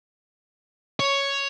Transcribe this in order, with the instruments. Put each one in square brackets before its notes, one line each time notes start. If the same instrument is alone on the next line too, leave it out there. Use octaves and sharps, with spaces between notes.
[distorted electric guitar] C#5